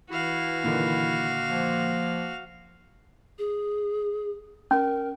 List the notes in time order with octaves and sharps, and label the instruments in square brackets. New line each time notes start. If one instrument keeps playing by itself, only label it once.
[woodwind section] E3 E4 [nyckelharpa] F#4 F5
[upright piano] A#2 D3 D#3
[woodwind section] F3 A#3
[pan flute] G#4
[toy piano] C#4 [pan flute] A#4